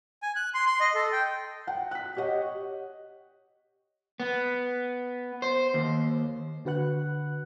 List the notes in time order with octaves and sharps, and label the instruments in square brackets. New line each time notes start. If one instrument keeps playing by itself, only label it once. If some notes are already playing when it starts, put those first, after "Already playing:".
[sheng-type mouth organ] G#5
F#6
C6
C6
D#5
A4
G5
[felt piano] F#5 G5
F#6 B6
G4 C#5 D#5 F#5
[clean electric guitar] B3
C5
D#2
[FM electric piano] D3 F#4 B4 F#5 F#6